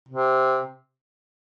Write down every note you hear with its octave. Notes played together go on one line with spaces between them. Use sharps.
C3